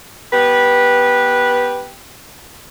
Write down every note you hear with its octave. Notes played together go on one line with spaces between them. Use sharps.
B3 G4 B4